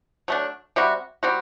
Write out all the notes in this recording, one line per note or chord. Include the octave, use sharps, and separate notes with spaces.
F#3 A3 D4
C3 G3 C4 F#4
G3 C4 F#4